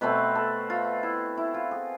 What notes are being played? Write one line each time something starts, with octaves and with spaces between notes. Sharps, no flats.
B2 A3 C4 B4
A4
F4
E4
E4
F4
G#4